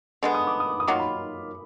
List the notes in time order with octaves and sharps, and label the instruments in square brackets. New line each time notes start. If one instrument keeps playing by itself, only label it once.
[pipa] D3 G#3 B3
[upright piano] D#6
D6
D#6
D#6
[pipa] D#3 F#3 A#3 F4 [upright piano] D6
[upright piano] B5